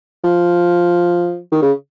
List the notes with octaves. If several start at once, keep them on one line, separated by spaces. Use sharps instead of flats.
F3
D#3
C#3